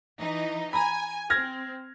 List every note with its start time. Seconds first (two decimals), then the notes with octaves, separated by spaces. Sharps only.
0.18 E3 D#4
0.73 G#5 A#5 B5
1.30 C4 F6 G#6 A#6